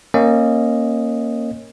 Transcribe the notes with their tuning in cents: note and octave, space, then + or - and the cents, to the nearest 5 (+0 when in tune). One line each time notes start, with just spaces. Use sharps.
A#3 +0 C#4 -20 D#5 +0